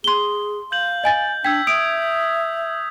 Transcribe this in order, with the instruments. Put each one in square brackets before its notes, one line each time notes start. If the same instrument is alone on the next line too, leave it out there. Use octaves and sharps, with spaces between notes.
[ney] G#4 [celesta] C6 G7
[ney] F5 [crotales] G6 F#7
[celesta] D#5 G#5 A6
[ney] D4 [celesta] G5 [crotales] E6 G#6 B6
[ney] E5 [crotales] D#6 [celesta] D7